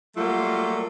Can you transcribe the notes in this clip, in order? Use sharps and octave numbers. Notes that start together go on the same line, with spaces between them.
F#3 G3 A3 A#3 F4